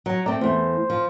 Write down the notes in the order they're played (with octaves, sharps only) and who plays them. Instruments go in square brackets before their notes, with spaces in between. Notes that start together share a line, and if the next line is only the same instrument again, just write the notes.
[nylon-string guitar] F#3 [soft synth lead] A#5
[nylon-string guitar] A3 C4 [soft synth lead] D5
[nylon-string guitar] E2 A3 [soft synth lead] C5
[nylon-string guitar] F3 [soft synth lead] C5